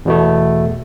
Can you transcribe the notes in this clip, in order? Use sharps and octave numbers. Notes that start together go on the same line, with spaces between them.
E2 B2 A3